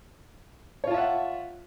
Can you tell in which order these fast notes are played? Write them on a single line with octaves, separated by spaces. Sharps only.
C#5 F4 A5 E5 F#5